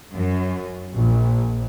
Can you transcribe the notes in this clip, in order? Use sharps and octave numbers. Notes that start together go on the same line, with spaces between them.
F#2
A#1